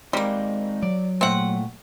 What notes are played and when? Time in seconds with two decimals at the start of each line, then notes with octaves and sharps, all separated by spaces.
0.13 G3 G#3 A#3 C4 D#4
0.83 F#3 D5
1.21 A#2 A3 C4 F#5